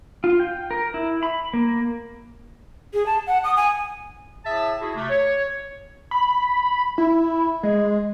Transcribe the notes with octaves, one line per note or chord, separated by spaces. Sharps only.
F4
G5
A#4
E4
B5
A#3
G#4
A5
F#5
D#6
G#5
A2 G#4 E5 A5
E4 F#4 G#4
C3 A3
C#5
B5
E4
G#3